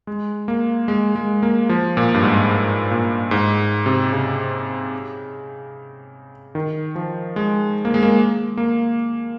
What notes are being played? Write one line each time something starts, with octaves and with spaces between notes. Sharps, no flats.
G#3
A#3
G#3
G#3
A#3
F3
A#2
G2
G#2
G#2
A#2
G#2
C3
C#3
D#3
F3
G#3
A#3
G#3
A#3
A#3